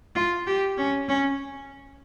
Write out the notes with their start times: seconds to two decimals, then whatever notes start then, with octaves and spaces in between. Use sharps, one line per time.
0.15 F4
0.47 G4
0.77 C#4
1.08 C#4